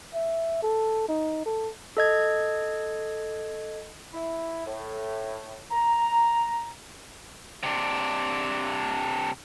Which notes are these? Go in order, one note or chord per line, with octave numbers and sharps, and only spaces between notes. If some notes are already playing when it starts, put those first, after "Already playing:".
E5
A4
D#4
A4
A4 D#5 G#6
E4
A2
A#5
C3 D4